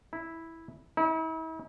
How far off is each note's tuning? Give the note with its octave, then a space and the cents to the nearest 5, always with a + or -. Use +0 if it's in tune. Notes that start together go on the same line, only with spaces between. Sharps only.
E4 -5
E4 -40